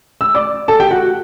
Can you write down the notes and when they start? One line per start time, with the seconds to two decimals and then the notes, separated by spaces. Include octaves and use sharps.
0.21 E6
0.35 D5 D6
0.68 A4 A5
0.80 G4 G5
0.91 F#4 F#5